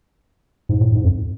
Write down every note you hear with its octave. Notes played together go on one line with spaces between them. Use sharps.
G#2
A2
G#2
F2